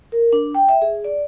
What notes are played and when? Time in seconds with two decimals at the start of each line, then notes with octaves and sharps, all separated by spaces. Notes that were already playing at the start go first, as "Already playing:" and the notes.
0.12 A#4
0.33 D4
0.55 G5
0.69 E5
0.82 G#4
1.04 D5